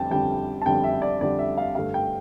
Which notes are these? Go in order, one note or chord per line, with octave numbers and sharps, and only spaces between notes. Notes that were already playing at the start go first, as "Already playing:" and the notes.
Already playing: F2 D3 G3 G5 A5
F2 D3 G3 G5
A5
F2 D3 G3 G5
E5
D5
F2 D3 G3 D5
E5
F5
G2 D3 A3 F5
G5